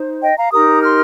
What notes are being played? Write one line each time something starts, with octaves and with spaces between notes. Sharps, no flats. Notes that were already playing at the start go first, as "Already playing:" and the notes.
Already playing: D#4 C5
D#5 G5
F5 A#5
D#4 G4 A#4 A#5 D#6
C6 F6